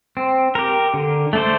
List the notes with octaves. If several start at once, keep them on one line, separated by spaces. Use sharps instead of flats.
C4
G4 A#4
D3
A3 D4 A4 C5